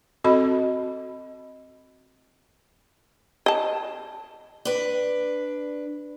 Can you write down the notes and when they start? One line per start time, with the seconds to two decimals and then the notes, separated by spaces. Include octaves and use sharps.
0.24 C4 F#4 A4 D#5 B5
3.46 D#5 A5
4.65 D4 B4